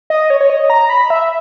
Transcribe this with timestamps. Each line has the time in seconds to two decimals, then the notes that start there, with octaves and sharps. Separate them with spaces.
0.10 D#5
0.30 C#5
0.41 C#5
0.50 D#5
0.70 A#5
0.90 B5
1.10 E5